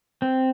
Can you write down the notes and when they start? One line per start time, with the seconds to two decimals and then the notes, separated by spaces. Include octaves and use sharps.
0.22 C4